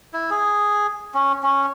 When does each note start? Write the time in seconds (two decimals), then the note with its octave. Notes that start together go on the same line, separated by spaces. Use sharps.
0.13 E4
0.30 G#4
1.14 C#4
1.43 C#4